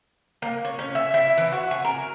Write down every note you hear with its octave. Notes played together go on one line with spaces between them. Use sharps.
A#3
C#5
C#4
E5
E4
E3
F#4
G#5
A#4